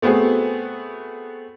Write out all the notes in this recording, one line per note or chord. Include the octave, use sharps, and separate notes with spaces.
A3 B3 C4 F#4 G#4